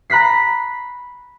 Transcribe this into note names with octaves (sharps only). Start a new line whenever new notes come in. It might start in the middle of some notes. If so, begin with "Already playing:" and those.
A#5 B5 F#6 B6 C7